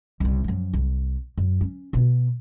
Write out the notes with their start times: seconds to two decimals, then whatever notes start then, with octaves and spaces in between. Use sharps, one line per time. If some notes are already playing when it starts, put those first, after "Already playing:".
0.20 C2 C#3
0.44 F#2 F3
0.74 C2
1.38 F#2
1.61 C#4
1.93 B2 B3